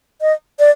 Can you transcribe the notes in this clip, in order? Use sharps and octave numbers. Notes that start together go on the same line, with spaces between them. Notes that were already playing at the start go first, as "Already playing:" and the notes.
D#5
D5